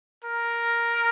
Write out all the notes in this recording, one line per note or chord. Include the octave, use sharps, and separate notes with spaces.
A#4